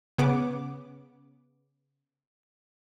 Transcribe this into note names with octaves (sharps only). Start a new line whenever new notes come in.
C#3 B3 D6